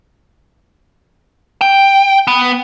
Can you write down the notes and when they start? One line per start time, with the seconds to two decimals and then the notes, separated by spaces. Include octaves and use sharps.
1.61 G5
2.27 B3